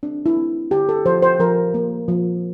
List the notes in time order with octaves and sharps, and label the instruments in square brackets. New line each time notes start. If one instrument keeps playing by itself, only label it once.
[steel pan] C4 D4
E4
C4
D3 G4
A4
F3 C5
C5
F3 A#4
A#3
F3